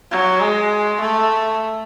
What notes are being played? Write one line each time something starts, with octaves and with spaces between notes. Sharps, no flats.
F#3
G#3
A3